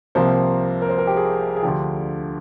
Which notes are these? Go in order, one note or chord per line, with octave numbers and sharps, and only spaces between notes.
C2 C3 F3 A#3 C5
A#4
C5
A#4
G4
G#4
G#4
D2 D3 F3 G4